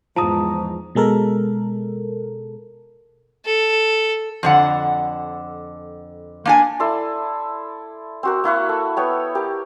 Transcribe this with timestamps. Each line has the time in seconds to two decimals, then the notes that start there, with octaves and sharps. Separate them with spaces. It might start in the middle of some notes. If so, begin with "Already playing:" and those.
0.16 E2 G#2 F3 A5 A#5 D#6
0.95 B2 G#3 A4 A#4
3.45 A4
4.43 F2 D3 F#5
6.45 A#3 D4 G#5
6.80 E4 A4 D5 C6
8.23 C4 F#4 A#4
8.44 A#3 E4 F#5 C#6
8.69 A4
8.97 B3 C#5 G5
9.35 G4 A#4